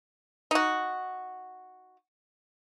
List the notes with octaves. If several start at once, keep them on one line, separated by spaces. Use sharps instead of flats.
D#4 F#4